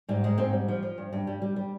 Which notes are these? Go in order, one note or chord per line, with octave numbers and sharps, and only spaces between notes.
G#2 G3
G#2 G#3
G#2 C4
G3
F3
F3
G2
G2
G3
G3
G3